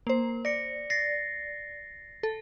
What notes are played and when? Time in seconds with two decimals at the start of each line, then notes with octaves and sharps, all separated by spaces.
0.07 A#3 C5
0.45 D5 A#6 C#7
0.90 A6 A#6 C7
2.23 A4